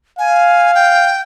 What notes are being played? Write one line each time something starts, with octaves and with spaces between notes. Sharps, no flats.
F5 G#5
G5